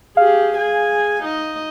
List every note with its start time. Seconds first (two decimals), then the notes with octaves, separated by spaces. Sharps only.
0.17 G4 G#4 F5
0.57 G#4 G#5
1.23 D#4 D#5